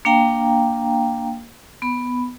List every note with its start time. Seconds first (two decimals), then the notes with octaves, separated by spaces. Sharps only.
0.05 A#3 D4 F5 G5 A#5
1.82 B3 B5